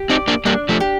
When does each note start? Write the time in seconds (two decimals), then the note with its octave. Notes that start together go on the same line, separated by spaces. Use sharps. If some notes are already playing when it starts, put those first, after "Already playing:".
Already playing: G4
0.10 C4 D#4 D5
0.28 A#3 D4
0.45 G3 A#3 D4
0.69 F3 A3
0.80 G4